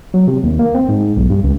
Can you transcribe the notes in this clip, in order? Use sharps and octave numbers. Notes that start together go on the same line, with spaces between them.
F#3
C3
D#2
A#3
C4
G#2
B1
G2
C#2